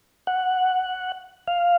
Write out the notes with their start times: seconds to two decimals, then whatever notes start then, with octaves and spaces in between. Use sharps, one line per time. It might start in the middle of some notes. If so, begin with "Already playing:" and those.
0.27 F#5
1.47 F5